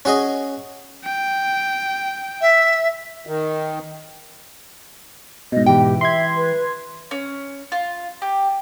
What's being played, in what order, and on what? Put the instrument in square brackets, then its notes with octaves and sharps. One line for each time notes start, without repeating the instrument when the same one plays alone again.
[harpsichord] C#4 F#4 G#4 D#5
[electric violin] G5
[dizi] E5
[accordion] D#3
[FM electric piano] G#2 B2 [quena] D#5
[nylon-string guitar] E3 G5 [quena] G4
[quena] E5 [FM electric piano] C6 G#6
[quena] B4
[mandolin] C#4
F4
G4